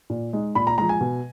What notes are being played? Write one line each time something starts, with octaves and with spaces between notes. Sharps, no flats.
A#2
G#3 D#4
A#2 B5
A#5
F3 G#3 A#5
G#5
B2